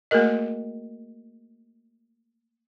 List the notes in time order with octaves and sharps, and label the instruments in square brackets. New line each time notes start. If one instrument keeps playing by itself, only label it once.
[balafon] A3 A#3 F#4 G#4 A#4 D#5